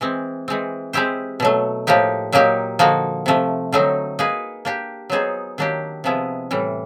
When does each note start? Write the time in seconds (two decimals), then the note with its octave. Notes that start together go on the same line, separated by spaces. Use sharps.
0.01 E3 G#3 C4
0.48 E3 G#3 C4
0.93 G#3 C4 E4 G4 C5
1.40 B2 F#3 A3
1.87 A2 F3 A#3 D#4 G4
2.32 A#2 F#3 A#3 D#4 G4
2.79 D3 F3 A#3 D#4 F#4
3.26 C3 F3 A3
3.72 D3 F#3 A3 C4 D#4
4.19 A#3 D#4 G#4 B4
4.65 A#3 D4 G4
5.10 F#3 B3 D#4 G#4 C5
5.58 D#3 F#3 A#3 D4 G4
6.04 C3 F3 G#3 B3 E4
6.51 A2 E3 G3